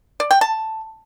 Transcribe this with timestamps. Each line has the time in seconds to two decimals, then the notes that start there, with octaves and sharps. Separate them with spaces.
0.20 D5
0.31 G5
0.41 A5